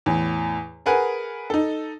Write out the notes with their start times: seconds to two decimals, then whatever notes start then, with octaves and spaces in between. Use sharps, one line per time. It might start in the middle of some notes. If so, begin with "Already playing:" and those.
0.06 E2 A2
0.86 G#4 A#4 B4 F#5 G#5
1.50 D#4 A4